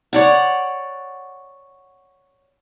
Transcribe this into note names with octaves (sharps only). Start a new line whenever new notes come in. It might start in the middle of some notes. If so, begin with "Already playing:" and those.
C#5 D5 F#5